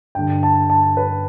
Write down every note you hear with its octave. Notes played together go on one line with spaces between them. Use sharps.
G2 D3 G5
A5
A5
B4